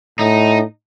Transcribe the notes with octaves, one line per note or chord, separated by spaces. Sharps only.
A2 D#4